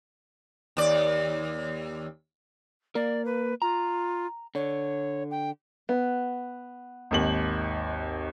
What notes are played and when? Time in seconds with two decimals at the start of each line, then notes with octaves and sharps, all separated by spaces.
0.77 D#2 D5
2.95 A#3 A#4 D5
3.25 B4
3.62 F4 A#5
4.55 D3 C#5
5.31 G5
5.89 B3
7.11 G#1 D#2 F#7